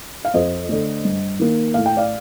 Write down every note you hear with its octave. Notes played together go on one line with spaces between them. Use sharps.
F5
F2 C5 D#5
D3 A3
G2
D#3 A#3
A2 F5
G5
D5 F5